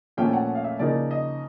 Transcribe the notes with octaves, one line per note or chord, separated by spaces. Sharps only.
A#2 F3 A3 C#4 G5
F#5
F5
E5
C#3 F3 A#3 D#4 D5
D#5